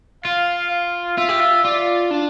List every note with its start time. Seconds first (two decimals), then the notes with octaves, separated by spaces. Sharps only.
0.25 F4 F5
0.71 F5
1.18 F4 E5
1.29 G4
1.40 F4
1.64 F4 D5
2.11 D4